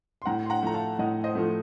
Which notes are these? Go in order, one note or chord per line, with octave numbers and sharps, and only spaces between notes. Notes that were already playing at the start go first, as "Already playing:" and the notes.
C6
A2 F#5 A#5
C6
F#5 A#5
F3 A3 A#5
F5 A5
A2 D#5 F#5
C5 D#5
F3 A3